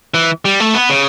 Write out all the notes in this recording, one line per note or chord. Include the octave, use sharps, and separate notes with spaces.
E3
G3
A3
B3
C#3